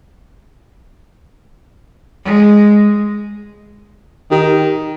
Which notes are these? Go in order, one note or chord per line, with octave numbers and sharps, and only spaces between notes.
G#3
D#3 G4